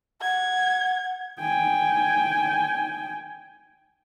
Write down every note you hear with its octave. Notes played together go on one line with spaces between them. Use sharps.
F#5 G#6
G5 G#5